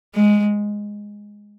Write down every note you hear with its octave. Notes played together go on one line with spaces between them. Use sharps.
G#3